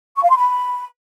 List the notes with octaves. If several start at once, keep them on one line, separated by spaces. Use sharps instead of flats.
C#6
F5
C6
B5